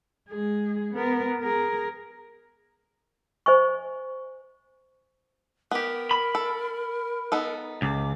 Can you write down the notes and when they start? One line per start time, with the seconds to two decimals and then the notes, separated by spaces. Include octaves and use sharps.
0.30 G#3 G#4
0.94 B3 A#4
1.41 G#4 A#4
3.46 C5 D#5 G#5 C#6
5.71 B3 G4 A#4
6.11 B5
6.35 A4
7.32 B3 D#4 A4
7.82 C#2 D6